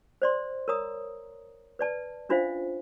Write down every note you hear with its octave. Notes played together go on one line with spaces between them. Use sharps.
C5 D5 C6
A#4 C#5 A#5 D#6
B4 D5 A5
C#4 D4 F4 C5 E5 F5